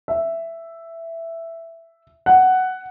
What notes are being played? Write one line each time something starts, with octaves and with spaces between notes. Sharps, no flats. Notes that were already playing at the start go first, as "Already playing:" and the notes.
E5
F#5